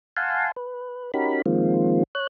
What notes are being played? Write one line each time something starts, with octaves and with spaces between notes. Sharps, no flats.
F5 F#5 G#5 A5 C6
B4
C#4 D#4 F#4 G4 A#4 B5
D#3 F3 G#3 A#3 C4 F4
C#5 F#6